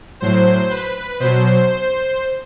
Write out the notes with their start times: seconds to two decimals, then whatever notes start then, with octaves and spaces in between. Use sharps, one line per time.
0.21 A2 F#3 C5
0.70 B4
1.20 B2 F#3 C5
1.69 C5